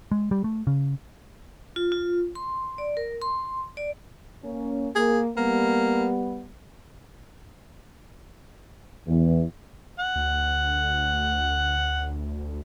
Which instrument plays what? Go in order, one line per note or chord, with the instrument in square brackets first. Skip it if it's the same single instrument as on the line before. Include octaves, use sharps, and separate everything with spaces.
[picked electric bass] G#3
G3
A3
C#3
[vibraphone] F4
F4
C6
D5
A#4
C6
D5
[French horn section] A#3 C#4
[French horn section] A#3 [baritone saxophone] G#4
[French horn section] G3 B3 [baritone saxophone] A#3
[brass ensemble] E2
[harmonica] F#5
[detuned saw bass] D2